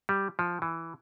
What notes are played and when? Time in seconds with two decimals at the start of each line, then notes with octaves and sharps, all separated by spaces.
0.09 G3
0.39 F3
0.62 E3